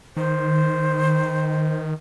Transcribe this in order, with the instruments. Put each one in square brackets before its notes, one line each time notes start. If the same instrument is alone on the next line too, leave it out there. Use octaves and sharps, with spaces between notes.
[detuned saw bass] D#3 [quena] C5